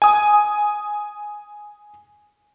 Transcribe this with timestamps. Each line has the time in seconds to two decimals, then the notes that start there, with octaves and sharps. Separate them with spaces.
0.02 G#5 D#6